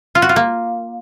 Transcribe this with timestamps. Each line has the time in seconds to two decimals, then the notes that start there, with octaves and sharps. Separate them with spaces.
0.15 F4
0.22 F#4
0.29 F4
0.36 A#3